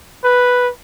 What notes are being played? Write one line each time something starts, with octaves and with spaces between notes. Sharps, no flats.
B4